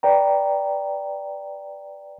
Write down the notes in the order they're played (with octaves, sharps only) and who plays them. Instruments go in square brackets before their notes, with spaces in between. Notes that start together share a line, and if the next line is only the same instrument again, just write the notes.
[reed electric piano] B4 D5 G5 A#5